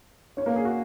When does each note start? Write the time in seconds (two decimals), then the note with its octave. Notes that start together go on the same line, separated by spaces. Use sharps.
0.37 C#4 C#5
0.46 A#3 A#4
0.56 G#4
0.65 F#4